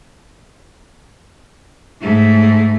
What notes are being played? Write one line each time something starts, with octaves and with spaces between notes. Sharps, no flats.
G#2 A3